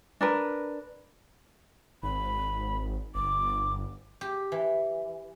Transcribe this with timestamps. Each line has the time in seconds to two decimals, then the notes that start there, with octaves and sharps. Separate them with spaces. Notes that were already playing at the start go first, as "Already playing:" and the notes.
0.21 D4 A#4 B4
2.03 G#1 B5
3.15 G1 D6
4.21 G4
4.52 E3